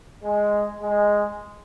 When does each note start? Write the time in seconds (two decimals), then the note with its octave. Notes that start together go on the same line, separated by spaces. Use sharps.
0.24 G#3
0.81 G#3